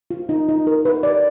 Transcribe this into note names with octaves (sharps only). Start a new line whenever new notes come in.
F4
D#4
D#4
A#4
B4
D5